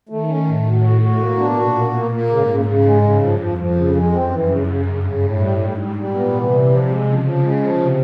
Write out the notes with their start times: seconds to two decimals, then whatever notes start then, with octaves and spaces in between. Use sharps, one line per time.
0.09 D#3 A3
0.27 C#4
0.46 A2 A3
0.65 F#3
0.83 F#4
1.01 F#4
1.19 B2 A#3
1.38 D4
1.56 A#2 F#4
1.74 A#3
1.93 A#2 A#3
2.11 A#3
2.29 G#2 C#3
2.47 C#3
2.65 C#3
2.84 G#3
3.02 G2 C#3
3.21 F3
3.39 F2 F3
3.58 F3
3.76 C#3
3.95 G#3
4.13 F#2 C4
4.31 E3
4.49 C#3
4.67 C#3
4.86 G2 C#3
5.04 C#3
5.23 A2
5.40 G3
5.58 G#2 G3
5.77 G3
5.95 A#2 G3
6.14 B3
6.32 C3 E3
6.50 G3
6.69 F3
6.88 G#3
7.05 C#3 F3
7.23 F3
7.42 G#3
7.60 F3
7.79 C3